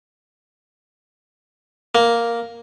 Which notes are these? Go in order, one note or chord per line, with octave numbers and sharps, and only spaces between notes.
A#3